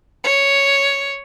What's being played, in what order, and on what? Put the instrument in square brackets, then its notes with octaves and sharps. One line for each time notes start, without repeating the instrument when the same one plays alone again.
[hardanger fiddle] C#5